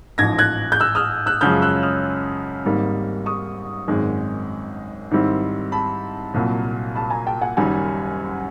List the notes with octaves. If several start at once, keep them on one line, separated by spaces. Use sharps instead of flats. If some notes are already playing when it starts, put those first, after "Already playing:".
A1 G#2 F3 G#6 A#6
F#6 G#6
G6
E6 F#6
D#6 F6
E6 F#6
F#2 C#3 F3 G#3 C#4 F6 G6
E6 F#6
D#6 F6
G#1 G#2 D#3 G3 A#3
C#6 D#6
G#1 F#2 D#3 G#3
G#2 D#3 G3 C4 E4
A5 B5
C2 A#2 F#3
A5 B5
G#5 A#5
G5 A5
F#5 G#5
F#1 F#2 D#3 G3 F#5 G#5